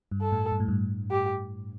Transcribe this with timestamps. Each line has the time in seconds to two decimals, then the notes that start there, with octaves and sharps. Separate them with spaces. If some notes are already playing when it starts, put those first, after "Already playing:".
0.11 G2
0.21 A4
0.32 A2
0.52 G2
0.60 A2
0.68 G2
1.11 G4